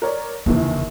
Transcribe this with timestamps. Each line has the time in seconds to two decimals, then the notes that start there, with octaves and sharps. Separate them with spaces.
0.02 A#4 C#5 D5
0.46 F1 A#1 D#2 C#3 E3